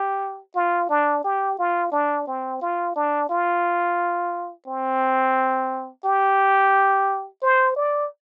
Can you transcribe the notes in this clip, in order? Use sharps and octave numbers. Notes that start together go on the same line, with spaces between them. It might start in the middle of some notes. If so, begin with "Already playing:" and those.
Already playing: G4
F4
D4
G4
F4
D4
C4
F4
D4
F4
C4
G4
C5
D5